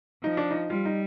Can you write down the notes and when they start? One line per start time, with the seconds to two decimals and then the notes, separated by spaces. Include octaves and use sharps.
0.24 F3 D#4
0.37 D4
0.51 D#4
0.70 G3 F4
0.85 D#4